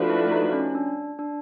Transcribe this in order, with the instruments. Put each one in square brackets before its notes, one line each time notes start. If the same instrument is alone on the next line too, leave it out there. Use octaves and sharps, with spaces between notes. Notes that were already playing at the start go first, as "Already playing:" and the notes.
Already playing: [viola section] F3 A3 D4 F#4 B4
[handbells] E4
D#4
C#4
D4
D4